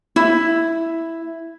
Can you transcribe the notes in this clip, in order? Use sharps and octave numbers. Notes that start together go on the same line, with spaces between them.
E4